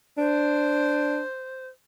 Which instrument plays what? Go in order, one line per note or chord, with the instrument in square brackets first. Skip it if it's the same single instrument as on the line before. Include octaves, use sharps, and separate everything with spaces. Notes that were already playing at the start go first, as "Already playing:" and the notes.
[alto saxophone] D4 [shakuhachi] C5